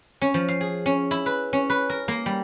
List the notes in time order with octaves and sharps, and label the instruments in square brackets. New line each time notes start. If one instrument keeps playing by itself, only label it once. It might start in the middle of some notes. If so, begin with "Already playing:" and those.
[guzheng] C#4
F3
F5
G#4
C#4
E4
B4
C#4
B4
A#4
A#3
G3